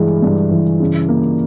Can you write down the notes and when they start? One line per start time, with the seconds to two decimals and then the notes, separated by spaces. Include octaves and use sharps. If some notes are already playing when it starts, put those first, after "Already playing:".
Already playing: G2 E3 G#3
0.22 G2
0.51 E3
0.80 C#3
1.09 A#3